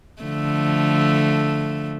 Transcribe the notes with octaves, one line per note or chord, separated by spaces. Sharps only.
D3 F3 A3